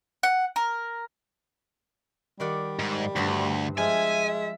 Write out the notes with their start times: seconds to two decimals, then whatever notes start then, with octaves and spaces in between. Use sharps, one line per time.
0.23 F#5
0.56 A#4
2.40 D#3 G3 D5 F#5
2.79 G#2
3.16 D2 G2 C5 B5
3.78 F3 G#3 E5 G#5